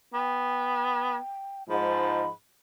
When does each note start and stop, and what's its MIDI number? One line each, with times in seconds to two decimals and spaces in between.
0.13 1.16 59
0.13 1.63 79
1.69 2.27 44
1.69 2.29 53
1.69 2.29 83